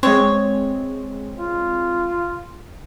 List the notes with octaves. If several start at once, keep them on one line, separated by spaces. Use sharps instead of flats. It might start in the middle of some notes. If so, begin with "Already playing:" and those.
G#3 C4 C#5
F4